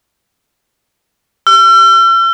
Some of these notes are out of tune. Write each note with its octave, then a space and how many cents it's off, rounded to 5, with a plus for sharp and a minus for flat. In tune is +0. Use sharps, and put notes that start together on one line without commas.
E6 +45